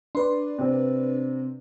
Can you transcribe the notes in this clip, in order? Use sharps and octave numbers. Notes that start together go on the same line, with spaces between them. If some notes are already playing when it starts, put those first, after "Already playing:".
D4 B4 D5 C6
C3 C4